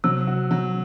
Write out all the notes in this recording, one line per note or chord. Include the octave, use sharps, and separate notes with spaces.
C3 F#3
F#4
F#3